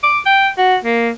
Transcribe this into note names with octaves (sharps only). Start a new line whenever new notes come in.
D6
G5
F#4
A#3